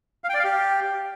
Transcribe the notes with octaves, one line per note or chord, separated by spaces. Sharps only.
F5
G5
D5
F5
G4